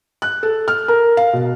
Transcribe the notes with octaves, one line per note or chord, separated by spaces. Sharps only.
F#6
A4
F6
A#4
F5
B2